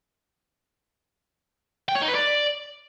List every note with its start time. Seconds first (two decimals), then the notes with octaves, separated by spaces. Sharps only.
1.89 G5
1.95 C#5
2.02 D#4
2.08 B4
2.15 D5